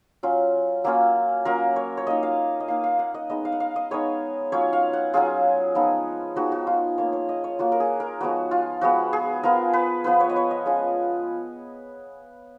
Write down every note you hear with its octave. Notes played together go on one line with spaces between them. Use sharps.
F#3 C#4 F4
F#3 A#3 C#4 F4
F#3 A#3 C#4 F4 A#4
C#5
C#5
A#3 D#4 D#5
F5
D#5
A#3 D#4 F5
F5
F#5
D#5
G#3 B3 D#4 D#5
F5
F#5
F5
D#5
G#3 B3 D#4 C#5
F#3 C#4 F4 C#5
F5
F#5
F#3 C#4 F4 G#4
F3 G#3 B3 D#4
F3 G#3 B3 D#4 F#4
F#4
F4
A#3 F4 C#5
C#5
D#5
C#5
A#3 F4 F#4
A#4
G#4
A#4
F3 G#3 B3 F#4
F4
F3 G#3 B3 F#4
G#4
F3 B3 F4 A#4
B4
F3 B3 F4 B4
C#5
D#5
C#5
D#5
G#3 C#4 F4